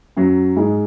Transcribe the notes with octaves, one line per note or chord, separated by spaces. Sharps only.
F#2 F#3
G#2 G#3